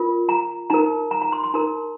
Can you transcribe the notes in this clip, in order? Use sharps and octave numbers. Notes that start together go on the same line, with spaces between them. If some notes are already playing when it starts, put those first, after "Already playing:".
Already playing: F4 A#4
A#5
D#4 A#4 A#5
A#5
A#5
C6
C6
D#4 A#4 A#5